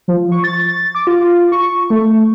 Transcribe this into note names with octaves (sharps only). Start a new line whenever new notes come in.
F3
C#6
A6
D6
F4
C#6
A3